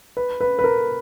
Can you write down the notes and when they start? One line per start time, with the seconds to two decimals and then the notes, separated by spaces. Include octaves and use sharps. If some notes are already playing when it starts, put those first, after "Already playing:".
0.17 B4
0.41 B4
0.59 B4
0.64 A#4